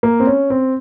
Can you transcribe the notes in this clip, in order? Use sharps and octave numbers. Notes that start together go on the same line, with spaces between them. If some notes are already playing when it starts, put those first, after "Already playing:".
A#3
C4
C#4
C4